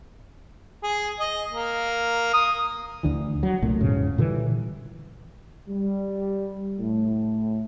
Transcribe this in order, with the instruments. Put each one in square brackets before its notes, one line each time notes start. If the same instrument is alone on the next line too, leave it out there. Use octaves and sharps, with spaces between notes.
[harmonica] G#4
D#5
A#3
D#6
[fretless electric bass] D2 D3 E3
F#3
C2 A#2 A3
E2 G#2 C#3
A#2 D3 E3 G3
[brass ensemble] G3
A2